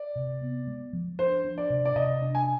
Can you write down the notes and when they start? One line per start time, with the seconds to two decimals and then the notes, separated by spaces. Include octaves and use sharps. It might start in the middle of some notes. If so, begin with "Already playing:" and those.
Already playing: D5
0.16 C3
0.41 B3
0.67 G#3
0.93 F3
1.19 D4 C5
1.44 D4
1.58 D5
1.70 C3
1.85 D5
1.96 C3 D#5
2.22 D4
2.35 G#5